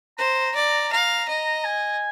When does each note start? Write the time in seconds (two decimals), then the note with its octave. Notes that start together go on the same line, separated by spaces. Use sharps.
0.18 C5 A#5
0.55 D5
0.92 F5 A#5
1.28 D#5
1.64 G#5